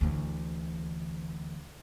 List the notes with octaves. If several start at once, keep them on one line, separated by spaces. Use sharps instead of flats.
D2 E3